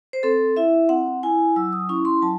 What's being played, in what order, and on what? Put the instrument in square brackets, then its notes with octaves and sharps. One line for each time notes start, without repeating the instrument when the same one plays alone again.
[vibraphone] C5
C4 A4
E4 E5
C4 F#5
E4 G#5
F#3 E6
D#6
C#4 E4 C#6
C6
F#3 A5